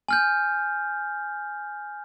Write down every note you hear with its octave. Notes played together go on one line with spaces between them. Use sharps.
G#5 F6 G6